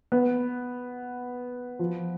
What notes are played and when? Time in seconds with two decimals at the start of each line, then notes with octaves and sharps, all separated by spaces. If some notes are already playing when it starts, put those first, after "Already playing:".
0.12 B3
1.79 F3